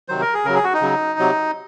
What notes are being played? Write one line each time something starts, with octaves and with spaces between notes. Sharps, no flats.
C3 D#3 F#3 C5
A#4
G#4
C#3 F#3 A#4
G#4
F#4
D#4
C#3 F#3
C3 F#3